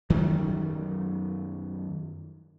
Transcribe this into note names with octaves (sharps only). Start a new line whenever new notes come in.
F#2 D#3 F#3 G3